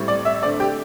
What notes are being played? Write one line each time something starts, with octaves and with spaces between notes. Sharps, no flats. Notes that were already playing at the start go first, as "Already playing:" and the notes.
Already playing: A2 G3 C4
D5
E5
D3 A3 C4 D5
G4